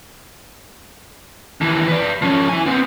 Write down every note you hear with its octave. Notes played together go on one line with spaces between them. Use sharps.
D#2 E3
B4 D5
F3 C#4
E4 G#5
B3 C4